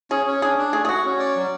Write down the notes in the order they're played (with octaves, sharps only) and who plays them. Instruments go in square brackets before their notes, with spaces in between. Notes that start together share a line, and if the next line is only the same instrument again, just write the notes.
[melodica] C#4 [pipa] G#4
[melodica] C#4
[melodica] D4 [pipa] G#4
[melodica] D4
[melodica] A3 [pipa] G#4
[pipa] G#4
[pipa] F#4 [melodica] F#5
[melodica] C#4
D5
F#3